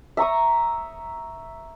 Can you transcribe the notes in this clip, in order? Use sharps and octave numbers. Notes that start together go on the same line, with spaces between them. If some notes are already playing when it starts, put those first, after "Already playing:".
E5 A#5 C#6 D#6